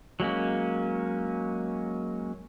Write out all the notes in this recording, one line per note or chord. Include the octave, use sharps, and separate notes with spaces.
F#3 G#3 A#3 C#4